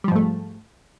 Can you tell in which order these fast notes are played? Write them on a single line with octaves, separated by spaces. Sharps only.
G3 F3 G#2 A3